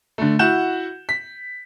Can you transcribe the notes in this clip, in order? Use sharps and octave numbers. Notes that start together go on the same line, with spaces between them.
D3 A3
E4 F#4 F#5 G6 E7
B6